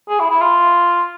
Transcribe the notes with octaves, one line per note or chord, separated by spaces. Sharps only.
G#4
E4
E4
F4